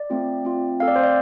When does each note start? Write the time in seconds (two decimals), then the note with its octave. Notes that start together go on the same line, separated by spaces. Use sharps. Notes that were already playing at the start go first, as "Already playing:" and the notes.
Already playing: D5
0.10 A3 C4 F4
0.45 A3 C4 F4
0.80 A3 C4 A4 F5
0.88 D5
0.96 C5
1.03 D5